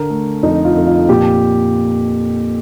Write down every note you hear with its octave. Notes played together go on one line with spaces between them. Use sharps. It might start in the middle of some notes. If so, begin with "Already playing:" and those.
Already playing: D3 A#4
A3
F2 D#4
F4
F2
F4
A#2 G4